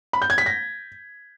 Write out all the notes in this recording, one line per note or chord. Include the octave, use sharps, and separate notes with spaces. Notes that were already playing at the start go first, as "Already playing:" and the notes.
B5
G6
G#6
B6
A#6